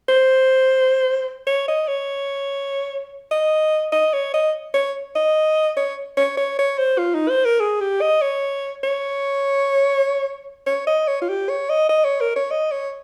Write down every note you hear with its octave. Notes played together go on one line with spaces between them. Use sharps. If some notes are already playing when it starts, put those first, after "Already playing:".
C5
C#5
D#5
C#5
D#5
D#5
C#5
D#5
C#5
D#5
C#5
C#5
C#5
C#5
C5
F4
D#4
C5
A#4
G#4
G4
D#5
C#5
C#5
C#5
D#5
C#5
F4
G4
C#5
D#5
D#5
C#5
A#4
C#5
D#5
C#5